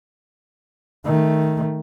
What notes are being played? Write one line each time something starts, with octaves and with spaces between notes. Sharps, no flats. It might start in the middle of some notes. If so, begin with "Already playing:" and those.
D#3 A3